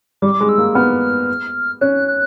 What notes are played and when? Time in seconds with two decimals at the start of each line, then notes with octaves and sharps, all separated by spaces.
0.22 G3 D6
0.41 G#3
0.49 E6
0.58 A#3
0.75 B3 F6
1.81 C#4 F#6
2.08 F#6